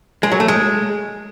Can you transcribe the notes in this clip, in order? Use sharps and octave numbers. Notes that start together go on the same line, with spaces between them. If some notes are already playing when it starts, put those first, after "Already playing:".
G#3
F#3
A3
G#3